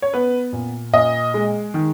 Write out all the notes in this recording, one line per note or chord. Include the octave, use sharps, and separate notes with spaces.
C#5
B3 B4
A#2
A#2 D#5
G#3
D#3